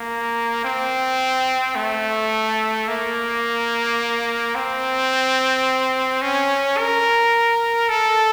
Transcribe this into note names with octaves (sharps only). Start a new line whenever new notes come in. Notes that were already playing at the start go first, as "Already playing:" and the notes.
Already playing: A#3
C4
A3
A#3
C4
C#4
A#4
A4